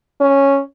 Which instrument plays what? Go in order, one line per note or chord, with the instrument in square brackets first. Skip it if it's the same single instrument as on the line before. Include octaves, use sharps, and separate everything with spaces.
[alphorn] C#4